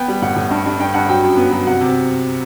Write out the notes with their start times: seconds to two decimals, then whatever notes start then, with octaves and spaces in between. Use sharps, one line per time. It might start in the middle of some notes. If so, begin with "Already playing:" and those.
Already playing: B3 G5
0.08 G3
0.22 A2 F#5
0.36 A2
0.51 G2
0.66 G2
0.79 G2 G5
0.94 G2 F#5
1.09 F#3 G5
1.24 F#2
1.37 B3
1.52 F#3
1.66 C3 F#5
1.81 C3